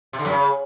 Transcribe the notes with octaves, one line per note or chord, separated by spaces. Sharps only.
C3
D3
F#2
C#3